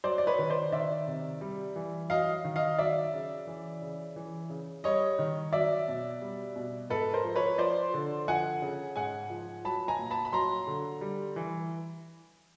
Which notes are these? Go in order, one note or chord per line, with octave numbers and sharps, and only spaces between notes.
F#3 C5 D5
D5
B4 C#5
D#3
C5 D5
D#3 D5 E5
C3
G3
E3
F#3 D#5 F5
D#3
D#5 F5
F#3 D5 E5
C#3
E3
C#3
E3
C#3
G3 C#5 D#5
D#3
F#3 D5 E5
B2
G3
B2
G#2 A4 B4
A#4 C5
F3
B4 C#5
F3 C5 D5
D3
F3 F#5 G#5
C#3
G#2 F#5 G#5
F3
F#3 A5 B5
G#5 A#5
A#2
A5 B5
B5
F#3 A#5 C6
D3
G3
E3